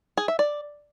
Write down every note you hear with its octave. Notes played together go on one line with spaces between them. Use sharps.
G#4
E5
D5